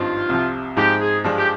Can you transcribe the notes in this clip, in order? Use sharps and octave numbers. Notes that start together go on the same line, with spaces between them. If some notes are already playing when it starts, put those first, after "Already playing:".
Already playing: G#1 G2 F3 C4 D#4 F4
C2 C3 F3
G#2 F3 G#3 C4 D#4 G4
G#4
G2 F3 G#3 D4
G4